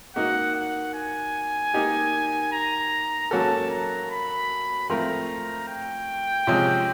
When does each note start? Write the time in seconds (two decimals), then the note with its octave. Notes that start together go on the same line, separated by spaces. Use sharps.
0.16 A#3 D#4 F#4 F#5
0.56 F#5
0.94 G#5
1.74 A#3 D#4 G4
2.53 A#5
3.31 F#3 A#3 C#4 F#4 A4 A5
3.71 A#5
4.11 B5
4.90 F3 A3 C4 F4 A#4 A#5
5.68 G5
6.47 C3 F3 G#3 C#4 F4